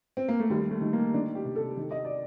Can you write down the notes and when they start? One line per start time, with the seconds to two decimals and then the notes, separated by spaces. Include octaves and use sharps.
0.17 C4
0.28 A#3
0.40 A3
0.50 D#2 G3
0.71 A3
0.81 D#3
0.93 A#3
1.14 D#3 D4
1.35 G4
1.45 C3
1.55 A4
1.77 D#3
1.91 D#5
2.05 D5